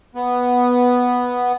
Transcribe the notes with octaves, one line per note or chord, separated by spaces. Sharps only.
B3